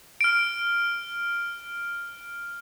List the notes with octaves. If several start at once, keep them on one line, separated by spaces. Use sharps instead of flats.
F6 D7